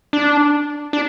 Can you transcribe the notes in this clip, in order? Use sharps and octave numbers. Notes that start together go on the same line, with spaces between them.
D4
D4